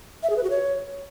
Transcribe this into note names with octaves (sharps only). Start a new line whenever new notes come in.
E5
G#4
B4
F#4
C#5